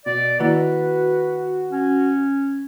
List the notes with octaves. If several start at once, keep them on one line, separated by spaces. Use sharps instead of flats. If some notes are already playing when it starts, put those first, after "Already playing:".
B2 D5
D#3 A#3 E4 F#4 B4
C#4